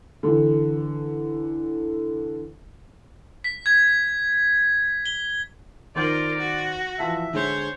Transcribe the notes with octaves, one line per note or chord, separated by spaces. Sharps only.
D3 E3
B6
G#6
G7
D#3 F4 A#4 C5 D5 G6
F#4
E3 F3 E5 A5
D3 G#3 C5 C#5